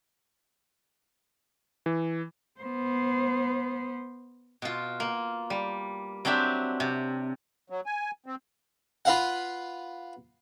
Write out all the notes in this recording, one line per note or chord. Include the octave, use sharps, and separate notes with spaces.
E3
B3 C5
B2 F4
A#3
G3
F#3 C4 D4 G4 E5
C3
F#3
G#5
C4
F4 B4 F5 F#5